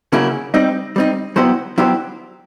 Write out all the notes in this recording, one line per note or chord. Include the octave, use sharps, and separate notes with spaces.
C#3 F#3 A#3 C#4 E4
G3 C4 D#4
G3 C4 D#4
F#3 B3 E4 G4 C5
F#3 B3 E4 G4 C5